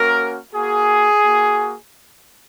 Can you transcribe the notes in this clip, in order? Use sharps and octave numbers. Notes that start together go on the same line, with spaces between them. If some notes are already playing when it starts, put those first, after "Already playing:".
Already playing: A#3 C#4 F#4 A#4
A#3 F#4 G#4
A#3 F#4